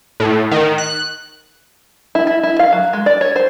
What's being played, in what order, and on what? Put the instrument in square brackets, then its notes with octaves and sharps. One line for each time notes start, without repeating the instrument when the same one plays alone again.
[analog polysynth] A2
D#3
F#6
[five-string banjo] E4
E4
E4
F5
F#3
G#3
D5
C#5
C5